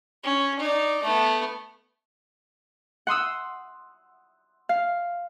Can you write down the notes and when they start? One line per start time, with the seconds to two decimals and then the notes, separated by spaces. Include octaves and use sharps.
0.24 C#4
0.59 D#4 D5
1.03 A3 B3
3.07 F#5 C6 D#6 E6
4.69 F5